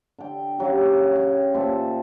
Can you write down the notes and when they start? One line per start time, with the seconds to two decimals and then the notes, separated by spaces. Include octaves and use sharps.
0.18 D3 G5
0.59 C#3 F#3 G4
0.85 C#5
1.12 C#5 G5
1.54 A#2 C5 E5 A5